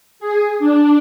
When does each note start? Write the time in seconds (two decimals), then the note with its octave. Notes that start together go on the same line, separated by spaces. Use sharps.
0.20 G#4
0.59 D4